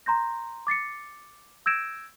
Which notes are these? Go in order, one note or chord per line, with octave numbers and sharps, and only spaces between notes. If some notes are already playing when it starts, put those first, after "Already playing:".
A#5 C6 G6 A#6
D6 A6 C7 C#7
E6 G6 G#6 A#6 D7 E7